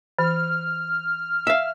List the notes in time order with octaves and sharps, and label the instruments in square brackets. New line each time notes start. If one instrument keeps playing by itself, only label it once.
[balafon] E3 [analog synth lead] F6
[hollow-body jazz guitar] E5 F5